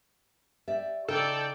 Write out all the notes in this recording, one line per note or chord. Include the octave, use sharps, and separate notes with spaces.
G4 D5 E5
C#3 D#4 A4 D5 G5